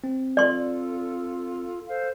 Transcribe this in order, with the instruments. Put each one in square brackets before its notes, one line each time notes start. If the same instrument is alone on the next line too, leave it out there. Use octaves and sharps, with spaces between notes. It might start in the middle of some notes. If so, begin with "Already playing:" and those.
[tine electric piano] C4
[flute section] F4 A4 [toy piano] D5 C6
[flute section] A4 C5 F5